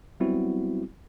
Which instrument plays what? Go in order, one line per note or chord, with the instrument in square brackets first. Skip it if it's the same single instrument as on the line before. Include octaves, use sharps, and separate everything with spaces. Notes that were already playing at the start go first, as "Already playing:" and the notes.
[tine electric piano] F#3 G3 B3 C4 E4 F#4